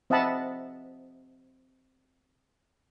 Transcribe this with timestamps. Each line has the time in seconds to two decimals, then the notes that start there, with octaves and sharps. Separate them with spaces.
0.10 C4 D#5 E5 F#5 A5 B5